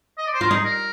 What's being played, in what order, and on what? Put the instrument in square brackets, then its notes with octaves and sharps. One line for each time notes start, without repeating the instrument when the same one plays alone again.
[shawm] D#5
D5
C5
[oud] F4 [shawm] A#4
[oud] D#4 [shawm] G#4
[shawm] A#4